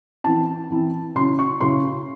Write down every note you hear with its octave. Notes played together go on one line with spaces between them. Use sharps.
E3 C4 E4 A5
E3 C4 E4
C#3 F#3 C#4 E4 C6
C#6
C#3 F#3 C#4 E4 C6